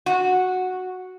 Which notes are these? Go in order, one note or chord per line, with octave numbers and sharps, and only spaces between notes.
F#4